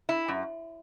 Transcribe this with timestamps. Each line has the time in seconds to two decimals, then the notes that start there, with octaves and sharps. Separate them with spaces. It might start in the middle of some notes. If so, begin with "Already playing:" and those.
0.09 E4
0.28 F#2